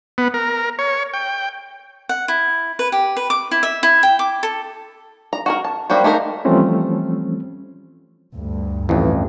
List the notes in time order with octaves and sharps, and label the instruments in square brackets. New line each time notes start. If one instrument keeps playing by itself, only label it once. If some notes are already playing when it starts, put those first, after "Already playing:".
[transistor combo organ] B3
A#4
C#5
G5
[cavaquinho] F#5
E4
B4
G4
B4
D6
E4
E5
E4
G5
D6
A4
[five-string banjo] A#5
F#4 A4 A#4
A5
G3 A#3 F#4 C5
A3 A#3 D#4 A#4
[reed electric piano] E3 F3 G3 A3 C4 C#4
[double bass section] D2 G2
[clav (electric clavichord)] A1 F2 [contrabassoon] E3